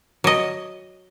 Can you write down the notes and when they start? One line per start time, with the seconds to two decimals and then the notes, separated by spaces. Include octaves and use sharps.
0.24 F#3 D#5